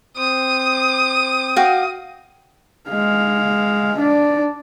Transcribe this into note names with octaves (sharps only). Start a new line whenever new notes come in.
C4 C5 D#6
F#4 F5 G5
G#3 F5
D4 D5